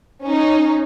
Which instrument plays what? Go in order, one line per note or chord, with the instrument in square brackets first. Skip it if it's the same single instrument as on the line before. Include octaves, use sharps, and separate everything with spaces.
[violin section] C#4 D#4